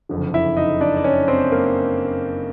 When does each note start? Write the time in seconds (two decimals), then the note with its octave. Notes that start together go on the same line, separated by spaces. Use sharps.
0.09 F#1 F2 D3
0.34 E4 E5
0.57 D#4 D#5
0.81 D4 D5
0.97 D5
1.04 C#4 C#5
1.28 C4 C5
1.52 A#3 A#4